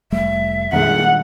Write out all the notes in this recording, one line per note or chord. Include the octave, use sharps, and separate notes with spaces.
F1 G3 A3 E5
A#1 D#3 G3 G#3 F#5